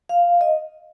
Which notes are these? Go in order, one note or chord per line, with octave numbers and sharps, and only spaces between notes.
F5
D#5